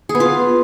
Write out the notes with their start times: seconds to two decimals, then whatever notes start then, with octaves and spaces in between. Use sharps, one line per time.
0.09 G#4
0.15 B3
0.20 F4